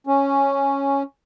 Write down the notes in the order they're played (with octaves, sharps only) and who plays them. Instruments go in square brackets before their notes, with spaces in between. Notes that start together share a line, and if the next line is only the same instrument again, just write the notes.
[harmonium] C#4